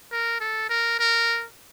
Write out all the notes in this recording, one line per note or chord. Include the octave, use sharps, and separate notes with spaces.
A#4
A4
A#4
A#4